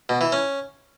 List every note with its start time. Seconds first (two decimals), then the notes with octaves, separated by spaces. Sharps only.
0.09 B2
0.21 E3
0.32 C#4